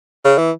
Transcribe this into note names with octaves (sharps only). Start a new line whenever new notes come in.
C#3
E3